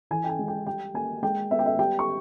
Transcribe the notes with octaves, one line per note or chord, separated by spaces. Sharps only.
E3 G#5
G5
G#5
G#3
G5
G3 G5
A#3 G#5
G#3 G5
B3 E5
G5
E5
G3 G5
C#6